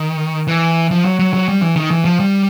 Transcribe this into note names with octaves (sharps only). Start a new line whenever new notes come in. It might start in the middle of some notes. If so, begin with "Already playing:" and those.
Already playing: D#3
E3
F3
F#3
F#3
F#3
G3
E3
D#3
E3
F3
G3